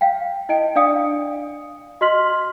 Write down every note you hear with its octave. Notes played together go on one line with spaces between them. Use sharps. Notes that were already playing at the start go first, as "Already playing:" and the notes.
F5 G5
E4 D#5 G5 D7
D4 D5 F5 D#6 C#7
F#4 D#5 C6 F6 B6 F#7